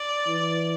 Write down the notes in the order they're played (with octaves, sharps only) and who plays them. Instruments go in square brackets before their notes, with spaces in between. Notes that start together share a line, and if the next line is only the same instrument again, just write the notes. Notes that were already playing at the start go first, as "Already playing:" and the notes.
Already playing: [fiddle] D5
[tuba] E3